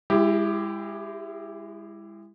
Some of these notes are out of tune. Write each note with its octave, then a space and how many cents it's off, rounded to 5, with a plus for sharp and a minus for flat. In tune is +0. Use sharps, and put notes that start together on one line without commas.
G#3 -35 E4 +10 G4 +0